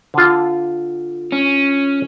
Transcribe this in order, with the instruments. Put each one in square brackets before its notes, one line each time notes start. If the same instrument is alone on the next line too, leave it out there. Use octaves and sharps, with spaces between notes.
[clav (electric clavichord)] D3 F4
[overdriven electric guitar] C#4